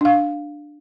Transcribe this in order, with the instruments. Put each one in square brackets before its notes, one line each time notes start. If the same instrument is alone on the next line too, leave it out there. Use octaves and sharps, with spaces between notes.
[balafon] D4 F5